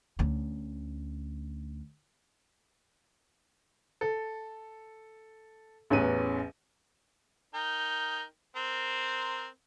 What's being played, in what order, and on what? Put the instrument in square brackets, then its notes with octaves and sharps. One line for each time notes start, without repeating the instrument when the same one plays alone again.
[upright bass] D2 C#4
[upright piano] A4
A1 E2 C#4 B4 D#7
[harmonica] D#4 A#4 G5
C4 A#4 C5